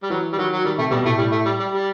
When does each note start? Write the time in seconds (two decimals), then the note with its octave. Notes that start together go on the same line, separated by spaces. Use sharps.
0.03 G3
0.10 E3 F#3
0.32 G3
0.37 D#3 F#3
0.52 F#3
0.64 D#3 G3
0.78 C3 A3
0.91 B2 G3
1.05 A2 A3
1.18 A2 G3
1.31 A3
1.45 G3
1.59 G3
1.72 G3